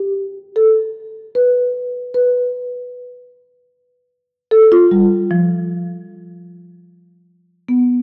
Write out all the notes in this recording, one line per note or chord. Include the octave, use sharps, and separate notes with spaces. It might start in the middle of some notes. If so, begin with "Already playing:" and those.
Already playing: G4
A4
B4
B4
A4
F4
G3
F3
B3